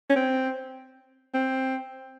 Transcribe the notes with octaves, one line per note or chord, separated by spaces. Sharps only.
C#4
C4
C4